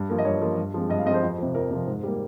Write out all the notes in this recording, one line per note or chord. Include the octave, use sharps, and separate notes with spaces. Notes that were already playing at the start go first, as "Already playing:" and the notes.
Already playing: G2
F3 A#3
D#5
G2 C#5
F3 A#3
G2
F3 G#3 C4
G2 D#5
F5
F3 G#3 C4 D#5
C5
F2
C3 F3
F2 A#4
C3 F3
G#2
G3 A#3